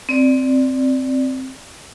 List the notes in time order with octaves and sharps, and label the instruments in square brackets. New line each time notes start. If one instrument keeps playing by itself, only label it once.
[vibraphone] C4 D5